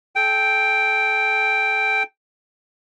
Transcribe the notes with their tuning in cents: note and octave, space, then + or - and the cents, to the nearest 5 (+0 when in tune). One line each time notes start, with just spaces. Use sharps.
A4 -35 G5 +0